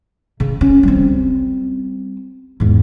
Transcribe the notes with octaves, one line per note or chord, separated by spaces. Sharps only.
C#3
C#4
G3 C4
E2 G#2